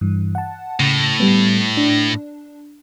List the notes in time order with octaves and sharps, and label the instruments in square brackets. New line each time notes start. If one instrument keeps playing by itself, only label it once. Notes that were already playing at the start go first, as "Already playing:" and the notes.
[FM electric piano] G2 E3
F#5 A5
[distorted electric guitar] A2 [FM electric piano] C#3
[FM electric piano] G3 B3
D4